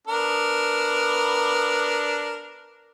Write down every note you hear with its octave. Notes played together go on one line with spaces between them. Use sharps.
B3 D4 A#4